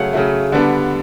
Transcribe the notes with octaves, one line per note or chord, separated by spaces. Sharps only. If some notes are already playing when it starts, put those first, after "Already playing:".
Already playing: C#3 F#3 A3 F5 F#5
C#3 F#3 A3
D3 G3 B3 D4